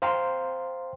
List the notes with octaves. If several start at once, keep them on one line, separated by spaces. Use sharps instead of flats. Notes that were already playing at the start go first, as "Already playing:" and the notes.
C5 F5 G5 A#5 C6